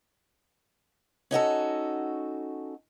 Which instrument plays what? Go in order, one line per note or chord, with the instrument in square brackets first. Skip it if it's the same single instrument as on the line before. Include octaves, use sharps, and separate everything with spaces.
[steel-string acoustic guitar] C#4 D#4 F#4 A4